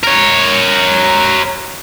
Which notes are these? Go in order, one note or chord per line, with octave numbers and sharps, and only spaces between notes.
A#4 C#5